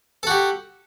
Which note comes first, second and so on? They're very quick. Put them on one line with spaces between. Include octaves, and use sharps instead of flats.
A4 F#4 G4